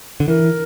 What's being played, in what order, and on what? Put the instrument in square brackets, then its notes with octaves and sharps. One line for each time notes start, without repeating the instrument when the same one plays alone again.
[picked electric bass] D3
[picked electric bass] E3 [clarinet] A#4